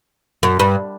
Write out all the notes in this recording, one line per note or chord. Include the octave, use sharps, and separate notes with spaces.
F#2
G2